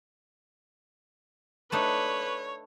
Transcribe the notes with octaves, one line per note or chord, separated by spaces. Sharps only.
A3 D4 D#4 B4 C#5